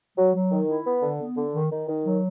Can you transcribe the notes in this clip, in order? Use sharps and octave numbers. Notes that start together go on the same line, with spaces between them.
F#3
F#3
D#3
E4
B3
D3
B3
D3
D#3
D#3
D#3
F#3